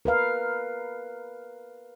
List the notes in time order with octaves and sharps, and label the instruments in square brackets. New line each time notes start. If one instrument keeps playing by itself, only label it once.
[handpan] A#4 B4 F5